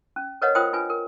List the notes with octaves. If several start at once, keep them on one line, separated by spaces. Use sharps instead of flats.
C#4
A#4 B4 C#5 D#5 F#5
F4 A#4 C5 G5 D#6
D4 F4 B4 G#5
A#4